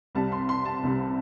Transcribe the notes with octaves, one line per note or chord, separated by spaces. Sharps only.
C2 C3 G3 A5
C6
C6
A5
C2 C3 G3